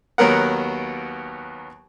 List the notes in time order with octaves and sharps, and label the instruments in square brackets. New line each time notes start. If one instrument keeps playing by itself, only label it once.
[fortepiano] D#2 F#3 B3 A#4 F#5